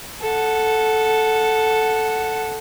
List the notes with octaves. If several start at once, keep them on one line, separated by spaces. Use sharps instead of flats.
A4 F#5